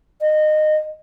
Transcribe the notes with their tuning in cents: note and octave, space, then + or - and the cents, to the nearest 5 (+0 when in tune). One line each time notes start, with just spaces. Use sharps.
D#5 -20